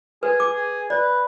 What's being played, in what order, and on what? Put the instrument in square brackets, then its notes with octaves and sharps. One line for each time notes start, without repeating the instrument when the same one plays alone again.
[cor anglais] G#4 [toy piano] B4
[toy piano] D6
[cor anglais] G#4
[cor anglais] B4 [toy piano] D5